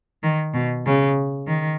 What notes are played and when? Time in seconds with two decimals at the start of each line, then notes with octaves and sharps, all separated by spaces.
0.23 D#3
0.54 B2
0.86 C#3
1.47 D#3